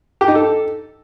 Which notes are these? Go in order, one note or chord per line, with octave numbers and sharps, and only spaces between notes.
G4
D#4
A4